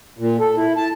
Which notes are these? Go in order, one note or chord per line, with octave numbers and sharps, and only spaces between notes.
A#2
A4
E4
A5